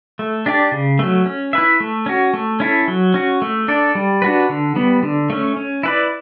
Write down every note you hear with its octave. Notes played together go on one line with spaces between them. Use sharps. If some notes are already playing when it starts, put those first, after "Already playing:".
A3
D4 G4 D5
C#3
F#3 A3
C#4
E4 B4 E5
A3
C#4 F#4
A3
C#4 E4 A4
F#3
C#4 F#4
A3
D4 A4 D5
G3
D4 F#4 B4
D3
G3 B3
D3
A3 C#4
C#4
E4 B4 D5